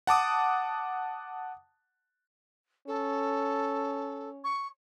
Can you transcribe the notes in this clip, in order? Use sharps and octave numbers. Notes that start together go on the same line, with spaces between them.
F#5 A5 D6 D#6
C#4 A4
C#6